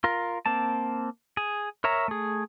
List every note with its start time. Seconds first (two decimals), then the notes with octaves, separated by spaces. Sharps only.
0.04 F4 A#4
0.46 A#3 C4 A5
1.37 G#4
1.84 A#4 C#5 E5 A#5
2.08 A3 G#4